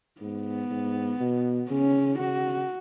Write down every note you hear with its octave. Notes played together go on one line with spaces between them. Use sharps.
G#2 B3
G#2
B2
C#3 C#4
C#3 F#4